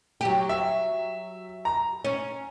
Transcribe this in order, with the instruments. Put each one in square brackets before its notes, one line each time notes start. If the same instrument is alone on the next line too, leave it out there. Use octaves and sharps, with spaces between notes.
[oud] F#3 G4
[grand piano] E5
A#5
[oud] C#4